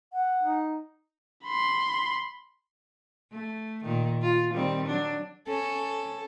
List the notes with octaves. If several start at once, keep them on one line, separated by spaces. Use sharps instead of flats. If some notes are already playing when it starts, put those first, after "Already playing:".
F#5
D#4
B5 C6
A3
A#2 D#3
F4
D#3 G3 C4
F#3 D4
C#4 A4